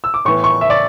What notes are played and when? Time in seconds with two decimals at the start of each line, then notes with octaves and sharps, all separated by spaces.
0.04 E6
0.14 D6
0.25 A2 E3 B3 C#6
0.44 C#6
0.61 E5
0.70 D5